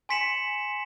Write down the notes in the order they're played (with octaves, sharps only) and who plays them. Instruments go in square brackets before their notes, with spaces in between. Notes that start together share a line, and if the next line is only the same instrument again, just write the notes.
[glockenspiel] G#5 C6 B6 C#7 E7 F#7